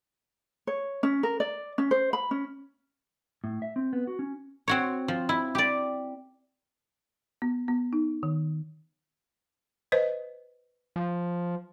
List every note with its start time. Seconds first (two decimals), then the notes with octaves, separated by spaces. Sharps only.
0.67 C#5
1.03 C#4
1.23 A#4
1.40 D5
1.78 C#4
1.91 C5
2.13 B5
2.31 C#4
3.44 A2
3.62 E5
3.76 C4
3.93 B3
4.07 F#4
4.19 C#4
4.68 C4 F#4 C#5
5.08 F3
5.29 E4
5.55 G4 D5
7.42 B3
7.68 B3
7.93 D#4
8.23 D#3
9.92 B4 C5 D#5
10.96 F3